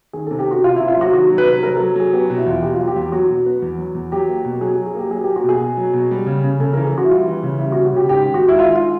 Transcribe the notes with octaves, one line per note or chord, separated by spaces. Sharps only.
D#3 G#4
C3 A4
G4
C3 F#4
C3 F4
C3 E4
F4
F#3 F#4
D#3 F#4
F#3
B4
C3
F#3 A#4
F#3 A4
F#3 G#4
B3 G4
B2 F#4
E4
E2 F4
B2 G4
F#3 F4
G4
E2
F#3 F#4
B2
B3
E2
F#3
E2
F#3 G4
A#3
B2
F#3 G#4
G#4
F#3
G#4
A#3 G4
F#3 G#4
A#3 G4
F#4
B2
G#4
B2
F#3
B2
G3
C#3
C#3
C#3 A4
E3 A#4
G#4
E3 F#4
E4
G3 F4
E3
C#3
G3 E4
F#4
C#3
F#4
C#3 G4
G#2 G4
D#3
F#4
G#3
E4
D#3 F4
G#3 F4